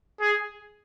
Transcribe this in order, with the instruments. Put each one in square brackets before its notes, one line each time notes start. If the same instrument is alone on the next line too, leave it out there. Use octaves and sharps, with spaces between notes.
[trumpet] G#4